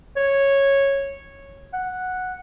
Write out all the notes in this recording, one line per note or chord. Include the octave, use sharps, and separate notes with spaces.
C#5
F#5